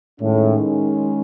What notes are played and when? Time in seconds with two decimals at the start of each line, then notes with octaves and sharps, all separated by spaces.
0.21 A2 D#3 G#3 C#4